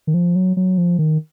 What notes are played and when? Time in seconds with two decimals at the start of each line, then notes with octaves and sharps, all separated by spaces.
0.07 D#3
0.14 F3
0.36 F#3
0.57 F#3
0.78 F3
0.99 D#3